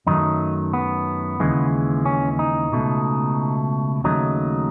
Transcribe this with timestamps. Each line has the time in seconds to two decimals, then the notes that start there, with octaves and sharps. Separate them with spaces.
0.07 F#2 D#3 F#3 A3 D#4
0.73 B3
1.40 D#2 C#3 E3 G#3
2.06 C#4
2.39 D#4
2.72 C#2 B2 A3
4.04 D#2 C#3 F#3 A3 D#4